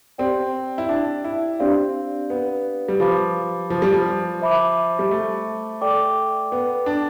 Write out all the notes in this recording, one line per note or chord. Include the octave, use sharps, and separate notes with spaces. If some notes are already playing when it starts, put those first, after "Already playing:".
C4 G4 D5 G5
E4
D4
E4
C4 D4 G4 D5 F5
B3
G3
F3 G4 B4 F5 B5 D6
F3
G3
F3
C5 E5 B5 D6
G3
A3
A4 D5 G5 D6
B3
D4